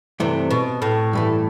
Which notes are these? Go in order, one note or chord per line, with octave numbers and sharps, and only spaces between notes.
G2 C3 E3 A3
B2
A2
G2 E3 A3